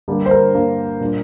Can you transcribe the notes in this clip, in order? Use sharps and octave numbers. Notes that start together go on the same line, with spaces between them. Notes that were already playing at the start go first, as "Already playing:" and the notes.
G2 D3 G3 A#3 D4
C5
A#4
G2 D3 G3 A#3 D4
A#2 G3 D4